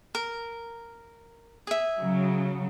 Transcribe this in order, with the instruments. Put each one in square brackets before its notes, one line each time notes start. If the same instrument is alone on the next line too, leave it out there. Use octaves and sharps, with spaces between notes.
[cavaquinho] A#4
G#4 E5
[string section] C#3 F#3